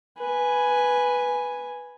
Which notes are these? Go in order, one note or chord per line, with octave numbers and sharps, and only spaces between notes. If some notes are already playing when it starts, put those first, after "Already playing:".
B4 G#5